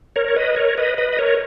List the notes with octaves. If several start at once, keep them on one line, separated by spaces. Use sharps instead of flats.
A#4 C#5
C#5
B4 D#5
A#4 C#5
B4 D#5
B4 D#5
D#5
A#4 C#5